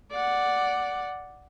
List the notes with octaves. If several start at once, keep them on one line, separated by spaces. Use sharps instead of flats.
D5 F#5